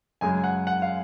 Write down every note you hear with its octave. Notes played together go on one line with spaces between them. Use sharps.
F#2 C#3 G#3 G#5
F#5
F#5
F5